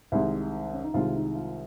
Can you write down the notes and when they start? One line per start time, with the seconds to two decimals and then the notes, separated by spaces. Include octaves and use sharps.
0.12 C2 C3 D#3 G#3
0.73 C#4
0.84 D#4
0.94 C2 C3 D#3 G#3 F4
1.15 D#4
1.35 F4